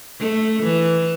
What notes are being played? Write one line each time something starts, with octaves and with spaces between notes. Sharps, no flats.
A3
E3